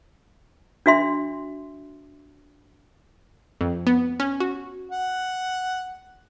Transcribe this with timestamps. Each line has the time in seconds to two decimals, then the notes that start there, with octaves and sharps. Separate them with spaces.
0.86 D4 F#4 E5 C6
3.61 F2
3.87 B3
4.20 C#4
4.40 F#4
4.91 F#5